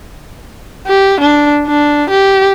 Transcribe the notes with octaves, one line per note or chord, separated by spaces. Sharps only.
G4
D4
D4
G4